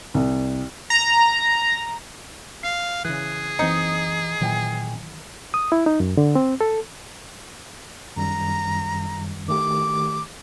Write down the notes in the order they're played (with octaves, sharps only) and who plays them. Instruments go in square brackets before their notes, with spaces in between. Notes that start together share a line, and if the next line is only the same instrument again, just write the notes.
[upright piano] C2
[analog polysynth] A#5
[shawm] F5 [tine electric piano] C7
[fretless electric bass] C#3 E3 [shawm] G#4 [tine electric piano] F#6
[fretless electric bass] F#1 C3 C4 [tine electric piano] E3 C#7 [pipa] D#4
[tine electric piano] A#2 G5 G#5 [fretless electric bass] D#3 E3 F#3
[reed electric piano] D#6
E4
D#4
F#2
D3
C4
A4
[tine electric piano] F#2 D#3 G3 [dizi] A#5
[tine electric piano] D#3 A3 G4 [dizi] D6